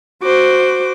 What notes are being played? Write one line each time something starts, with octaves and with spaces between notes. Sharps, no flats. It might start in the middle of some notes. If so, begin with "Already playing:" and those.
F#4 C5 D6